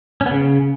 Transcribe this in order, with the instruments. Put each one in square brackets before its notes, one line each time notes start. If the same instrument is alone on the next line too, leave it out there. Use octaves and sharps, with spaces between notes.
[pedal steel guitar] C#4
B3
C#3